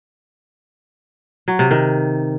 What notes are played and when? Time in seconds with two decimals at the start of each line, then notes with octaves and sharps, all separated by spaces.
1.48 F#3
1.59 C3
1.71 D#3